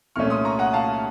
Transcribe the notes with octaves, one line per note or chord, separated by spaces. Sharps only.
C2 A#2 A3 C#4 C#6 F6
C6 D#6
A#5 C#6
F#5 A#5
F5 A5